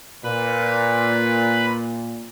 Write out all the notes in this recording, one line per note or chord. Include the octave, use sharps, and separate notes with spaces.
A#2 B4 B5